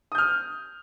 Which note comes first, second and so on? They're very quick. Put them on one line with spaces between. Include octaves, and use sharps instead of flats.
D#6 G6 F6